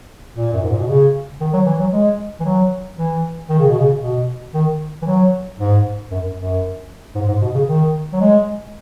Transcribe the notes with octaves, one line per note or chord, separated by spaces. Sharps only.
A#2
F#2
G#2
A#2
B2
C#3
D#3
F#3
E3
F#3
G#3
E3
F#3
E3
D#3
C#3
B2
C#3
B2
D#3
E3
F#3
G#2
F#2
F#2
G#2
G#2
B2
C#3
D#3
F#3
G#3